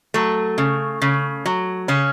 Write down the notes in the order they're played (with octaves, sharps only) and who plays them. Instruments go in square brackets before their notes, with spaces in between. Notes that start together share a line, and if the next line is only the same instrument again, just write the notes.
[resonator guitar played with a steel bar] F#3 A3
C#3
C#3
F#3
C#3 C#4